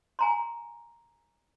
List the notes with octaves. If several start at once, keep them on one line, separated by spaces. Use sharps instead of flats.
G#5 A#5 C6